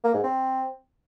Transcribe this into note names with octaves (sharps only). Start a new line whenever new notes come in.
A#3
G#2
C4